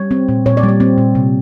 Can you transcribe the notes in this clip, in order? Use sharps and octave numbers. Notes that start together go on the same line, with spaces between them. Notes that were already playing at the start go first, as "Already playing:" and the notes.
Already playing: G3 C#5
C4
A#2
A#2 C#5
D5
G3
D5
C4
A#2
C3